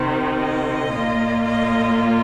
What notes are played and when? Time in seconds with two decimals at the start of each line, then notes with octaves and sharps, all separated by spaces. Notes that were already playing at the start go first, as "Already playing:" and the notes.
Already playing: C3 D#3 C4
0.37 D#5
0.91 A#2 A#3 F4
1.45 D#5